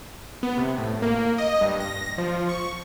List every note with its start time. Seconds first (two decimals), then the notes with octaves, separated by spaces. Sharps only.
0.43 B3
0.57 C3
0.78 A2
1.02 A#3
1.38 D#5
1.61 G2
1.80 A#6
2.18 F3
2.49 C#6